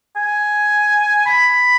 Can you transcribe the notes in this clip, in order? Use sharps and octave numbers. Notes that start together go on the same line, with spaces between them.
G#5
B5